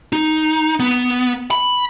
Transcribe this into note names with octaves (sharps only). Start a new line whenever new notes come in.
D#4
B3
B5